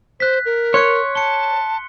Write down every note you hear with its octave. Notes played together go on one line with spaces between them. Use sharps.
C5 F#6 B6
A#4
C#5 C6 F#6 C#7
A5 C#7 G7